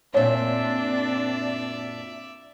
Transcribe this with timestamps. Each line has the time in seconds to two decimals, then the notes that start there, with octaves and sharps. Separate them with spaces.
0.14 F#2 A#2 C4 D4 C#5 D5 E5